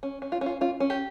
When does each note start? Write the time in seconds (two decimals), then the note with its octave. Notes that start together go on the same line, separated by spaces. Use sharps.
0.03 C#4
0.22 C#4
0.32 F4
0.41 C#4
0.46 F4
0.61 C#4 F4
0.80 C#4
0.90 G4